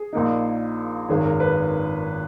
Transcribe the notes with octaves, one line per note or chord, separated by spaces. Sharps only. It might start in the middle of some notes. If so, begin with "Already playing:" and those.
Already playing: G#4
A#1 A#2 A#3 D#4
G#1 F#2 D#3 G#4
A#4
B4